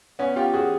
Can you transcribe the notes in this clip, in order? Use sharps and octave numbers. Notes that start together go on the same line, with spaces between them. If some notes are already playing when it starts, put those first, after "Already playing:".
B3 C#4
F4 G4
F#4 G#4